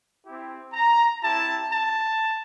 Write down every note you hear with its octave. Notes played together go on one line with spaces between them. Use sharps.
C4 E4 G4
A#5
C4 E4 G4 A5
A5